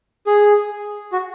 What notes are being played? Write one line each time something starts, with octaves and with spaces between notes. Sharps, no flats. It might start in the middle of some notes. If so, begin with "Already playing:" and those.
G#4
F#4